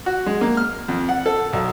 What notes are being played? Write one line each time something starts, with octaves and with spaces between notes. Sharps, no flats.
F#4
G#3
A#3
F6
F2
F#5
A4
B1